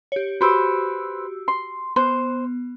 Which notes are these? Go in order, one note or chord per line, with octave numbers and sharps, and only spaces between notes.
G4 C#5
F#4 G4 B4 C5 E6
C6
B3 C5